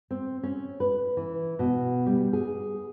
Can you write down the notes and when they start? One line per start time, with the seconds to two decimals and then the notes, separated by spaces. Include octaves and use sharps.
0.10 C4
0.43 C#4
0.80 B4
1.17 E3
1.59 B2
2.06 G3
2.33 G#4